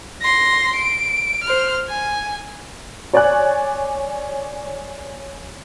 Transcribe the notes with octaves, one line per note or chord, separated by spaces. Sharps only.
C6 A#6
D7
C5 F6
G#5
C#5 D5 G#5 F#6